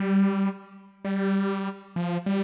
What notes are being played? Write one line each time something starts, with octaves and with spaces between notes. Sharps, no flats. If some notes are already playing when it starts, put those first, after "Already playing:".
Already playing: G3
G3
F3
G3